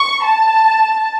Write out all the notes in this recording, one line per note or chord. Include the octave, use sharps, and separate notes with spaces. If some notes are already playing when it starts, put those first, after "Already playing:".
Already playing: C#6
A5